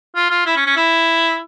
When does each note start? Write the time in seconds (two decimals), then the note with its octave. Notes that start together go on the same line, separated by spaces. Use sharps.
0.15 F4
0.30 F4
0.46 E4
0.56 C#4
0.66 C#4
0.76 E4